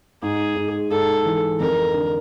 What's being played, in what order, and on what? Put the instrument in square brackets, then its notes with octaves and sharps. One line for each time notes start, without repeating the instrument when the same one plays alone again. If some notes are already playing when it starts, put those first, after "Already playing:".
[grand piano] G#2 [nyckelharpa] G#4
[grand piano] G#2
[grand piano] G#2 [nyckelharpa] A4
[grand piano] E3
[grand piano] F2 [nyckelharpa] A#4
[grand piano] D3